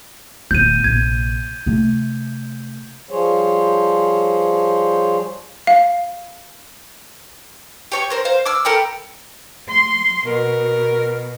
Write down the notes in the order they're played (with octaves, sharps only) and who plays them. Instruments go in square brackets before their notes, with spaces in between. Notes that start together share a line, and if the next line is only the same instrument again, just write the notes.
[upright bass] D1 B3 [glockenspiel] G6 D#7
[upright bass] A#1 C3 [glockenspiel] G#6
[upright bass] C3 A3
[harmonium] F3 G3 G#4 C5 C#5
[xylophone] F5
[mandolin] G4 C#5 C#6
C4 A#4 C5
C5 F5
D6 E6 F6
A4 A#4 G5 B5
[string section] C6
[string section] B2 [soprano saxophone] A#4